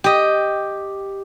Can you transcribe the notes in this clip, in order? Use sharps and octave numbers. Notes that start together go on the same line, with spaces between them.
G4 D#5